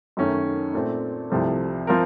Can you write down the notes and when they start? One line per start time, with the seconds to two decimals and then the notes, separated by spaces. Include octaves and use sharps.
0.17 F#2 D#3 A3 C#4
0.74 A#2 A3 C4
1.30 C2 C3 F3 A3
1.87 F3 C4 F4 A#4